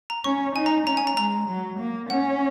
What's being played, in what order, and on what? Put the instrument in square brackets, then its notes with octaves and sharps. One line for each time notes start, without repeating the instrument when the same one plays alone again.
[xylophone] A#5
[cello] C#4 [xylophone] C#6
[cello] D#4 [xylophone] G#5
[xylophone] A#5
[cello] C#4 [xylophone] A#5
[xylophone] G#5
A#5
[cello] G#3 [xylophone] A#5
[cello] F#3
A#3
[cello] C#4 [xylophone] F#5